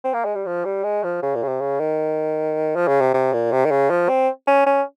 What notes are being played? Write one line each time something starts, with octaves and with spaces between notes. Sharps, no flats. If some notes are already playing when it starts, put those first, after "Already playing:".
C4
A#3
G#3
G3
F3
G3
G#3
F3
C#3
A#2
C#3
C3
C#3
D#3
F3
C#3
C3
C3
A#2
C3
D#3
C#3
F3
C4
C#4
C#4